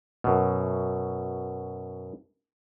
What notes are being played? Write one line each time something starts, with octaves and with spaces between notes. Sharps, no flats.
F#2 B2